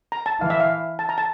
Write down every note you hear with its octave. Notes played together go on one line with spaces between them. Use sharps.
A#5
A5
E3 F5
E5
F5
A5
A#5
A5